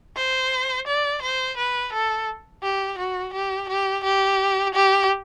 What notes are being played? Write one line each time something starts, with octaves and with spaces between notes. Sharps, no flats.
C5
D5
C5
B4
A4
G4
F#4
G4
G4
G4
G4